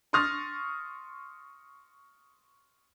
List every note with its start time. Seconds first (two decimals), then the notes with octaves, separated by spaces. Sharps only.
0.13 C6 C#6 D#6 F6 A6 A#6